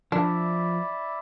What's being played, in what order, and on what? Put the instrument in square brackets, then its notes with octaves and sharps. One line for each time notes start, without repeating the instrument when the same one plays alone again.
[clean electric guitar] F3 [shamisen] D4 [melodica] E4 D5 E5